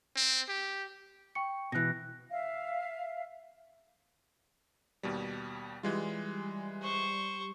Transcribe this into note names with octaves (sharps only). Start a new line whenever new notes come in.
C4
G4
G5 C#6 C#7
B2 E3 F#6 A#6
E5 F5
D#2 B2 G3
E3 G3 G#3 F4
C5 C#6